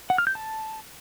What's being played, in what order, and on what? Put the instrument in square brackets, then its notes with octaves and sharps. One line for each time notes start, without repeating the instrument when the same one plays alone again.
[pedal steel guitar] F#5
F6
G6
A5